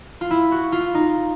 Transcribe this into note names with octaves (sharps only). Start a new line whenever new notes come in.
F4
E4
F#4
F4
D#4